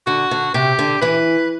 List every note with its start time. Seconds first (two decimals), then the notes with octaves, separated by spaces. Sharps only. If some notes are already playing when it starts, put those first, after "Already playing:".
0.07 D3 F#4
0.31 D3
0.54 C3 G4
0.79 D3
1.02 E3 B4